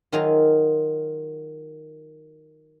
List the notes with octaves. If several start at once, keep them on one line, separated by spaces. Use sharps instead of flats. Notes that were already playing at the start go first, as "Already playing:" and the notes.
D#3 F#3 F4 G#4 E5 A#5